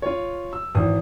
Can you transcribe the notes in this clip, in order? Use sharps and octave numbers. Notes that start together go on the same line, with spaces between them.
F4 C#5
E6
G#1 E3 D#6